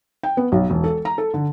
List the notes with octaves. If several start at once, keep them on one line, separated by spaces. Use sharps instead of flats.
G5
B3
B1
E1
A4
A#5
A4
D3